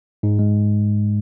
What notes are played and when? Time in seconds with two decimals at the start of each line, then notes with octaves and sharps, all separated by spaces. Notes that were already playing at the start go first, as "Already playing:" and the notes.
0.23 G#2
0.39 G#3